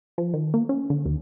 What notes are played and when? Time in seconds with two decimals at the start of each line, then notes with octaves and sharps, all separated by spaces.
0.18 F3
0.33 D#3
0.54 A#3
0.69 C#4
0.90 D3
1.05 D#2